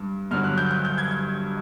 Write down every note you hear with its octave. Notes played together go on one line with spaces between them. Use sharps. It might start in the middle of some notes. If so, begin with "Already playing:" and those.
Already playing: G2
G2 D3 F#3 F6
F#6
G6
G6
G6
G#6
G#6